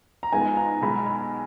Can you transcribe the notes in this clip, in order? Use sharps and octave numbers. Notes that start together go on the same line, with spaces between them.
A#5
G#2 F3 G#3 B3 F4 G#5
A#5
B1 B2 G#3 B5
B5